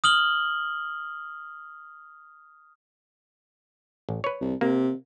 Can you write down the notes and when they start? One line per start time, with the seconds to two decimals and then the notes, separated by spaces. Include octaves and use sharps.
0.04 D#6 F6 F#7 G7
4.09 A1
4.24 B4 C#5
4.41 C2
4.61 C3 A#3